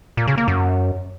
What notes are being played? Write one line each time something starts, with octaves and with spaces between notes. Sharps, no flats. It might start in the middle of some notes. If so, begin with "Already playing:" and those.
A#2
C#3
A#3
F#2